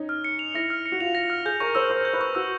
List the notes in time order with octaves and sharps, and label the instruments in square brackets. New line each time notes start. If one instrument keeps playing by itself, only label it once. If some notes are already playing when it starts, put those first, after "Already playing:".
Already playing: [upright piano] C#4 D#4
[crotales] F6
C#7
F7
[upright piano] E4 [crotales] A#6
[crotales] F6
C#7
[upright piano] F#4
[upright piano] F4 [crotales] F7
[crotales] A#6
F6
[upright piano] G#4 [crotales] G6
[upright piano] A#4 [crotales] C#6
[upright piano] C5 [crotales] E6
[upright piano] C5 [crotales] C#6
[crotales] G6
[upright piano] B4
[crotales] C#6
[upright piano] F#4 [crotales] E6